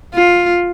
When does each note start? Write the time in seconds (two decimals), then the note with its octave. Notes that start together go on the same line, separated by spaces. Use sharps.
0.14 F4